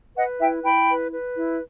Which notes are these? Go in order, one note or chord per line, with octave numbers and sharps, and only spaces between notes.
B4 D#5 F#5
E4 E5 G5
E4 G5 B5
B4
B4
E4